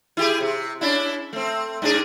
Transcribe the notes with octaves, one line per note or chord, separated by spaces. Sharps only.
E4 G4 G#4
C3
C#4 D4 E4
A3 C4
G#2 D4 G#4